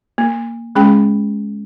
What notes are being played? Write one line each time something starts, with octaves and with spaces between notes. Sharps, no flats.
A#3
G#3 C#4 G#4 G5